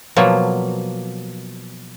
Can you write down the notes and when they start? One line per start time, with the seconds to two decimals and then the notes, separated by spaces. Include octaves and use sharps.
0.17 B2 F3 F#3 A#3